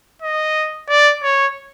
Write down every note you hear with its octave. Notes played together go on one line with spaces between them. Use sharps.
D#5
D5
C#5